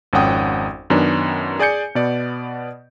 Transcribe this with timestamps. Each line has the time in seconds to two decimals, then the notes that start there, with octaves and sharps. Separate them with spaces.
0.13 G#1 F2 C#4 F#5 G5 D#6
0.90 F#2 D#3 B3 C#4 D4
1.59 G#4 D5 G#5 G6 C#7
1.95 B2 B3 D5